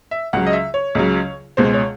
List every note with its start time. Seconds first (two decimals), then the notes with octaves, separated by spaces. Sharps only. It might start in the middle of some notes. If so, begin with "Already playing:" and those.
0.11 E5
0.33 C#2 C#3 F#3 F#5
0.46 D#5
0.53 E5
0.74 C#5
0.95 C#2 C#3 F#3
1.57 C#2 B2 G#3 C5
1.74 C#5